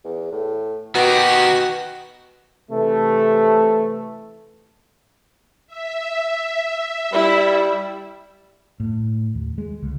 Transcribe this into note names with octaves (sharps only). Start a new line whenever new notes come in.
E2
A2
B2 D#3 F#4 G4
C3 E3 A3
E5
G3 E4
A2
D#2
G#3
C#2